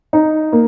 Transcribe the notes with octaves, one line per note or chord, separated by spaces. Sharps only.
D#4
A#3